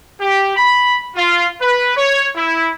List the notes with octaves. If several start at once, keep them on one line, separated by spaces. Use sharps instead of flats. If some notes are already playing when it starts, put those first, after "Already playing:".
G4
B5
F4
B4
C#5
E4